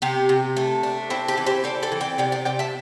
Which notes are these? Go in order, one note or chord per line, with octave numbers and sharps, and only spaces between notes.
C3 G4
C3
A3
D4
C4 E4
G4
E3
G4 C5
C4 A4 D5
A4 D5
E3
D5 G5
C3 D5 G5
D5 G5
C3 D5 G5
E5 A5